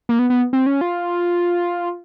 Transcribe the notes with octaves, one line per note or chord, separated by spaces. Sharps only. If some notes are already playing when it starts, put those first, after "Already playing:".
A#3
B3
B3
C4
C#4
F4